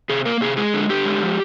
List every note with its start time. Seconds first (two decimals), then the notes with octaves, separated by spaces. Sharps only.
0.09 C3 G#4
0.25 A#3 A#4
0.41 C3 G#4
0.57 G#3 G#4
0.74 D3
0.89 D3 G4
1.05 G#3
1.22 F3